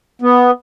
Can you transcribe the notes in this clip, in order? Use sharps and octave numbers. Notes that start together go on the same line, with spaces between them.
B3